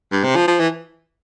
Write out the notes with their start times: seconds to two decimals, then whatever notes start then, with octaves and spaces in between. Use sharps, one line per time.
0.12 G2
0.24 C3
0.35 F3
0.47 F3
0.60 E3